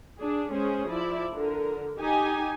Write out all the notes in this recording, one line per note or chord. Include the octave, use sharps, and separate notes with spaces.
D4 G#4
G#3 C#4 G#4 C5
F3 E4 D5
D3 A#4
D#4 G4 G#5